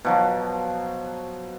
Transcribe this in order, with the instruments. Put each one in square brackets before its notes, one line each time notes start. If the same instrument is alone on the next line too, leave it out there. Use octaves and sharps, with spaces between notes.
[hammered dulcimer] B2 F3 F#3